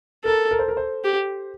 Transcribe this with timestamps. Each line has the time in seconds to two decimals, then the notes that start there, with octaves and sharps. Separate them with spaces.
0.24 A4 A#4
0.51 A#4
0.59 C5
0.68 A#4
0.77 C5
1.04 G4